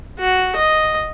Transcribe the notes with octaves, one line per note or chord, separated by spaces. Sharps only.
F#4
D#5